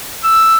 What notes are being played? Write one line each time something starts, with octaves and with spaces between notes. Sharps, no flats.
E6